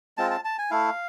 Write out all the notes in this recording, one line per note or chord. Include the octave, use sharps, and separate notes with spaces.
G#3 C4 F4 A5
A5
A5
G#5
A3 E4 F5